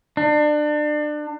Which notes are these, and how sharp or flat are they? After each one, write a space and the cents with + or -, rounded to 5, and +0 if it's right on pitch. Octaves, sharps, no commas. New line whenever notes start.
D4 +30